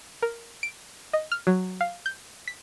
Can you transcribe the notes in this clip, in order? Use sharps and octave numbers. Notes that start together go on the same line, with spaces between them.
A#4
D7
D#5
F6
F#3
F5
G6
B6